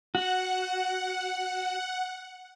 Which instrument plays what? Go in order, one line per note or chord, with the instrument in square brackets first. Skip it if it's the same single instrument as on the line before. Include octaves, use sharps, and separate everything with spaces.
[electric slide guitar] F#4 [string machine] F#5